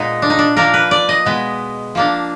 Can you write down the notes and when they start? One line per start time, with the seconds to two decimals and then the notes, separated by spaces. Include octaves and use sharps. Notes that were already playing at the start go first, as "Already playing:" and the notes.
Already playing: A#2 G#3 B3 D#4
0.22 D4
0.30 D#4
0.39 D4
0.57 F3 A#3 D4 A#4
0.74 B4
0.91 D5
1.09 D#5
1.25 B2 G#3 B3
1.95 F3 A#3 D4